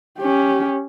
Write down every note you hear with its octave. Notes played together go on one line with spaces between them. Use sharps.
C#4 G4